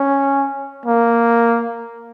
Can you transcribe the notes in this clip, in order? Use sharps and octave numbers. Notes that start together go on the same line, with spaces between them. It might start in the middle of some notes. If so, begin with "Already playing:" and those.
Already playing: C#4
A#3